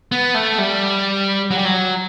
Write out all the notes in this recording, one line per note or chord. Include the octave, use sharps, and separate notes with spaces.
B3
A3
G3
F#3
G3
F#3